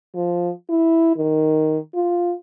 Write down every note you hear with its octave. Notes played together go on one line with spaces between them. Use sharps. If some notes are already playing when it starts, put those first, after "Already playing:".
F3
E4
D#3
F4